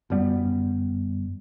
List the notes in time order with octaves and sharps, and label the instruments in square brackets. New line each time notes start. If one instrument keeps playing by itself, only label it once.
[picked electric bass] G1 F#2 G3 B3